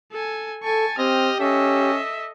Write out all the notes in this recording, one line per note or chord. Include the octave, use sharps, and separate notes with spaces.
A4 G#5
A4 G#5 A5 C#6
C4 G4 D#5 F6
C#4 A4 D#5 E5